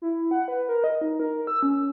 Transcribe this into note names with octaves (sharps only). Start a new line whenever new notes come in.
E4
F#5
B4
A#4
D#5
D#4
A#4
E6
C#4